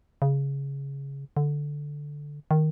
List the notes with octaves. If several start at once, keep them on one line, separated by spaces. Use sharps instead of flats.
C#3
D3
D#3